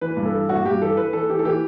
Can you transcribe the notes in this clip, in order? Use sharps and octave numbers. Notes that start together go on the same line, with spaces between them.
E3 B4
G2
A4
E3
G2 F#4
G2 G4
E3 A4
E3 B4
E3 A4
E3 G4
A4
E3 G4